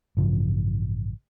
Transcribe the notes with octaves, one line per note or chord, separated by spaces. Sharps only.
A1 G2 C#3 F3